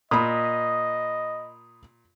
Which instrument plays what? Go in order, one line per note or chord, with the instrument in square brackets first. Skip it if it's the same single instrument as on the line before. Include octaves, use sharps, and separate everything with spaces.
[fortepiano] A#2 [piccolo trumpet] D#5 [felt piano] B5 D#6